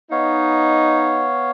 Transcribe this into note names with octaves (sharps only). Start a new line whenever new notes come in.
B3 D#4 C#5 F5